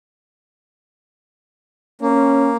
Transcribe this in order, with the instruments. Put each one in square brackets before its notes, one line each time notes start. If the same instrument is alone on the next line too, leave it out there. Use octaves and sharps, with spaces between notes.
[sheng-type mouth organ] A#3 [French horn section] C#4